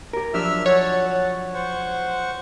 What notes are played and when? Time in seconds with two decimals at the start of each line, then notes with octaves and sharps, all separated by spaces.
0.13 G4 A#4
0.34 F3 F#3 D4 E5 E6 F6
0.66 C#5 F#5 A5
1.54 C5 F#5 C#6